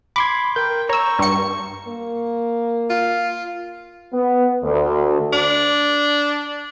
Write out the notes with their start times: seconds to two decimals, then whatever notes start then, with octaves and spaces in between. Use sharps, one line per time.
0.16 B5 C6 D6 G#6
0.56 A#4 G5 G6
0.89 C#5 A#5 C#6 E6
1.19 G2 C#7
1.88 A#3
2.90 F4
4.13 B3
4.64 D2
5.33 D4